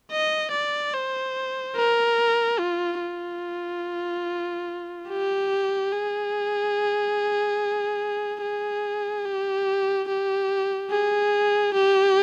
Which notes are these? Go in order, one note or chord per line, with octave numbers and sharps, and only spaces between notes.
D#5
D5
C5
A#4
F4
F4
G4
G#4
G#4
G4
G4
G#4
G4